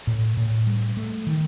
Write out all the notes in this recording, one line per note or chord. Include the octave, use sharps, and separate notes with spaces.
A2
A2
G3
A3
D#3